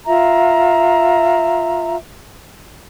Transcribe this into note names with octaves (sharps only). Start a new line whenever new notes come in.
F4 E5 A#5